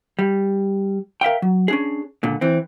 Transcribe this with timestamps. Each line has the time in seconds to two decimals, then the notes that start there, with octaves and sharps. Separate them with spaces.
0.19 G3
1.21 A#4 E5 F5 G5
1.42 F#3
1.68 C#4 D4 G#4
2.23 C#2 A#2 D3
2.41 E3 C4